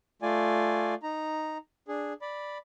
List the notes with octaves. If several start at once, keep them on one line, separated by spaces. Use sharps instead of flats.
A3 F4 D5 G#5
D#4 A#5
D4 G#4
D5 B5